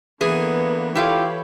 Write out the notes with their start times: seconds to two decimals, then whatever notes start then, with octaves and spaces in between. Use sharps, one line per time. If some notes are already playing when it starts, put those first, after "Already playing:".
0.21 D3 E3 A#3 B3 G#4
0.95 E4 F4 G4 A4 C#5 F5 B5